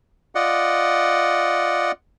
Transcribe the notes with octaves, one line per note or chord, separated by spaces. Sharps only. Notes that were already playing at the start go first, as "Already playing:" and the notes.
F4 D5 D#5 F#5